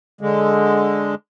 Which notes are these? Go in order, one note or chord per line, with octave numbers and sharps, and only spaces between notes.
D3 G#3